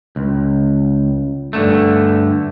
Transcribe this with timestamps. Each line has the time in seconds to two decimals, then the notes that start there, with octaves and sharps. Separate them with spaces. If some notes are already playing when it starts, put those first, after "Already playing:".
0.16 C#2
1.53 G2 D3 A3